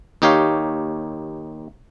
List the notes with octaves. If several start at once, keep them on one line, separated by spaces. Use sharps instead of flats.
D#2 D#4 G4 C#5 F5